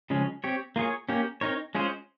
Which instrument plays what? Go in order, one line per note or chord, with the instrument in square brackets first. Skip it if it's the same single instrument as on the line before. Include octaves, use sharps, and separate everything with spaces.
[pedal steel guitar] C#3 F3 G#3 C#4
C4 G4 C#5
A#3 F4 G#4 C#5
A#3 C#4 G4
C4 D#4 A#4 C#5
G#3 C#4 F4 G#4 C5